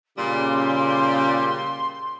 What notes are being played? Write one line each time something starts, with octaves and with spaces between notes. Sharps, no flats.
A#2 C#3 G3 G4 C6